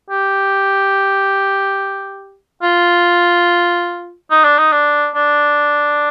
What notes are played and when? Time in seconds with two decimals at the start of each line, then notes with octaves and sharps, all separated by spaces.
0.10 G4
2.62 F4
4.31 D#4
4.44 D4
4.58 D#4
4.72 D4
5.15 D4